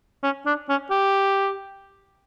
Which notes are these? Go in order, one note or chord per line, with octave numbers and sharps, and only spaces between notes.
C#4
D4
C#4
G4